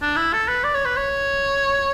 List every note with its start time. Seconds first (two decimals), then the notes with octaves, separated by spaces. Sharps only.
0.02 D4
0.16 E4
0.33 A4
0.48 B4
0.64 D5
0.74 C#5
0.85 B4
0.97 C#5